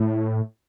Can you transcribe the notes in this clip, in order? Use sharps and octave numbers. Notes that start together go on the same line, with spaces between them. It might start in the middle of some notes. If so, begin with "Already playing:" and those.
Already playing: A2